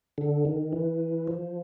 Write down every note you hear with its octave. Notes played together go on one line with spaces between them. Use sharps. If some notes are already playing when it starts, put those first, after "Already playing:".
D3
D#3
E3
F3